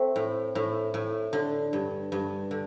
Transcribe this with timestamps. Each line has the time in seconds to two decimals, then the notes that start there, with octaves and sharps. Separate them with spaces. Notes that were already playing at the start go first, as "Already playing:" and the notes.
Already playing: A3 C4
0.16 A2
0.55 A2
0.94 A2
1.33 D3
1.73 G2
2.12 G2
2.51 D3